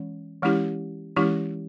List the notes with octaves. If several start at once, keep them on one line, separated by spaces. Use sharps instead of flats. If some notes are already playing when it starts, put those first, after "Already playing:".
Already playing: E3 G#3 C#4
E3 G#3 C#4 E4 G4
E3 G#3 C#4 E4 G4